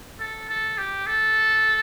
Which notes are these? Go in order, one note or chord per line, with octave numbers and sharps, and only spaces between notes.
A4
A4
G4
A4